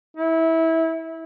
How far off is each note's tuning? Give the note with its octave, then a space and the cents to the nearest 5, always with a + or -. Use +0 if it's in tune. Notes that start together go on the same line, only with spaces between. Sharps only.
E4 -20